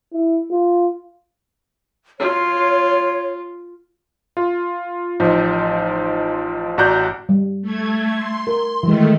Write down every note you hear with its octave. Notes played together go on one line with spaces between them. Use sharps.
E4
F4
F4 C#5
F4
A1 F3 D#4
A1 F#4 D5 A#5 F#6 G6
G3
A3 G#6
C6
A#4
D#3 E3 G#3 A3